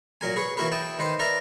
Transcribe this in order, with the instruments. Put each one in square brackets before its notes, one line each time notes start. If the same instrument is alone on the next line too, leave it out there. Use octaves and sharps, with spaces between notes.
[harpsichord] A#2 F#3 A#4 G#5
G#4 B4 C#5
E3 A#3 E4 F#4 A#4 B4
E4 G5 A5 D#6
D#3 B4 C5
A#4 B4 D5 E5 A#5